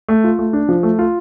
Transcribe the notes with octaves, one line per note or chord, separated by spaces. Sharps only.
A3
F4
A3
D4
F3
A3
F4